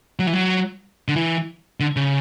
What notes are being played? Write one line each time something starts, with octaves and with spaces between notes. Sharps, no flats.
F#3
E3
F#3
D3
E3
D3
C#3